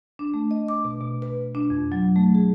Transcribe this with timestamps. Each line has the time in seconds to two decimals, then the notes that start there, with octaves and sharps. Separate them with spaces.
0.19 D4
0.34 A3
0.51 D#5
0.68 D6
0.84 B2
1.01 B2
1.22 B4
1.55 D4
1.70 F2
1.92 F#3
2.16 A3
2.35 G#4